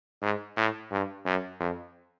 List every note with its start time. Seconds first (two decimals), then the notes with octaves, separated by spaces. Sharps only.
0.22 G#2
0.57 A2
0.91 G2
1.26 F#2
1.60 F2